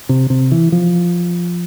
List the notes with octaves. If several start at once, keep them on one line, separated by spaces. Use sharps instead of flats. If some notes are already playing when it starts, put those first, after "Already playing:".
C3
C3
E3
F3